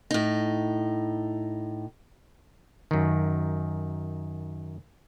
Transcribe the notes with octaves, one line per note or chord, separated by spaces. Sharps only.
A2 D#4
F#2 D#3